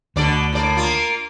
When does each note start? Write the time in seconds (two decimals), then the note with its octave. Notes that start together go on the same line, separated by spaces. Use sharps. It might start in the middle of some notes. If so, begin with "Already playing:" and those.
0.16 D2 B2 D3 D5
0.53 A2 A#3 D5
0.77 A#3 F4